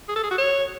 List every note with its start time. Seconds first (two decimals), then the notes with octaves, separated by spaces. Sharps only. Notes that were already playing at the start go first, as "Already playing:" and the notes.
0.08 G#4
0.16 A4
0.23 G#4
0.30 F#4
0.38 C#5